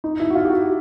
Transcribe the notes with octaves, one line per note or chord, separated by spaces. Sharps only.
D#4
E4
F#4
F4
G4
F#4